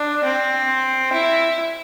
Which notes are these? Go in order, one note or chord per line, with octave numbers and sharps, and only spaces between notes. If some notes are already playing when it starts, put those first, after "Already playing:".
Already playing: D4
C4
E4